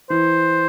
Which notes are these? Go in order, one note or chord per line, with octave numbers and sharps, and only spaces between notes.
E3 C5